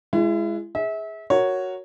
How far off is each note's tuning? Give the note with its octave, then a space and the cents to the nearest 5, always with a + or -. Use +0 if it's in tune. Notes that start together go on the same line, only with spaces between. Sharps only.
G#3 +0 E4 +35
G#4 +0 E5 -30
F#4 +0 A#4 +0 C#5 +0